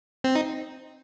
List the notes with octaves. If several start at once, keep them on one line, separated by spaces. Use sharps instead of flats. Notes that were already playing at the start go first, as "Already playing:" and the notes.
C4
D#4